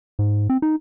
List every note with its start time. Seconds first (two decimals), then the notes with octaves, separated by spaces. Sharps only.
0.19 G#2
0.50 C4
0.62 D#4